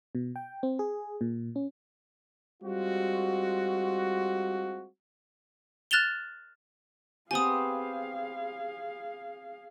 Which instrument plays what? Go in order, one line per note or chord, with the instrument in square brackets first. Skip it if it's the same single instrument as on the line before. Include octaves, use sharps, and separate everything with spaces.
[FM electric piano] B2
G5
C4
G#4
A#2
C#4
[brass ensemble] G3 G#3 C4 F4 F#4
[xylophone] F6 F#6 A6 E7 F7 G7
[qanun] B3 C4 G4 [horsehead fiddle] G#4 F5 [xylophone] G#5 D#6